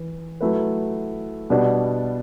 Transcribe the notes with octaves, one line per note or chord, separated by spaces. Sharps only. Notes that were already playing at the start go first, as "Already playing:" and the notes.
Already playing: E3
F#3 A3 E4 B4
B2 G3 B3 D4